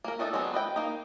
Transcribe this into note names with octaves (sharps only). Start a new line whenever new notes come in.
A#3 A#4
A3 D4 D#4 G#4 A4
F#3 G#3 B3 C4 D4
B4 D#5 G5
A#3 D#4